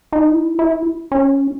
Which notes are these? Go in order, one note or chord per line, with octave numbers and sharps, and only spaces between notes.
D#4
E4
E4
C#4